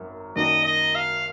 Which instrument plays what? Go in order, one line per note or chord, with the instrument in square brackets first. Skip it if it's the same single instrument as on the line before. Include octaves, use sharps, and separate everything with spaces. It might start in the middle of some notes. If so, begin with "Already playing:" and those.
Already playing: [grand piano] G#1 F#2
[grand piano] F#2 D#3 A#3 D4 F#4 [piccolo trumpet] D#5
[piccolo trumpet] D#5
F5